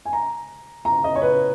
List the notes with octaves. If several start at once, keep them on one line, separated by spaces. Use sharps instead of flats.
G#5
A#5
A#5
D#5
C#5
B4